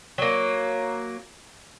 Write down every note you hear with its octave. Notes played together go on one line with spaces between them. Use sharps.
F#3 A#3